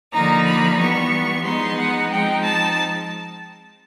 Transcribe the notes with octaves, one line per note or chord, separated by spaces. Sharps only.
D3 F3 A#3 D#4 A#5
B5
E3 G3 B3 C#6
F3 G#3 B3 D#4 C6
F#5
F3 G#3 C4 D#4 G5
A5